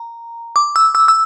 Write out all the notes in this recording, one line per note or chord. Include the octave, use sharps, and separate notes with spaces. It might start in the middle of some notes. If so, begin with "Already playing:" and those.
Already playing: A#5
D6
E6
E6
E6